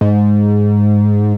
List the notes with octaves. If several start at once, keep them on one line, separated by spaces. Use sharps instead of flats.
G#2